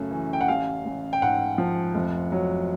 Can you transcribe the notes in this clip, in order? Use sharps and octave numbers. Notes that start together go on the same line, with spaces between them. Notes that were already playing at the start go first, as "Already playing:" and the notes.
Already playing: F#2 C#3 A3
E3
G5
F#5
A1 F5
A1
G5
G#2 F#5
F3
F1
F#3